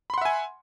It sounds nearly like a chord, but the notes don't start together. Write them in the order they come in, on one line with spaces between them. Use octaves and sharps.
B5 C6 F#5 E5 G#5